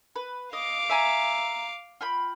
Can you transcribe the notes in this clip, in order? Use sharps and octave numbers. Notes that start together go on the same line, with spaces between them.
B4
D#5 F5 D6
E5 G#5 A#5
F4 G5 B5